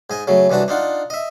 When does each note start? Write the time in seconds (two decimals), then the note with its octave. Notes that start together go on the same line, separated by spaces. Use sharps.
0.10 G#2 D#5 G#5
0.28 C#3 F#3 A3
0.50 C2 E3 D4 F#4 A5
0.68 D4 D#4 F4 F#5
1.10 D#5 E5